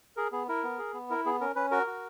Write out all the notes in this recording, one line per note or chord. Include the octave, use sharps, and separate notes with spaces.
G#4 A#4
B3 G#4
E4 A#4
B3
G#4
B3
E4 A#4
B3 G#4
C#4 A#4
C#4 B4
F#4 A#4
F#4